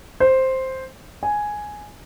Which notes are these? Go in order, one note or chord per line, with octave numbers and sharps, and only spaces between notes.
C5
G#5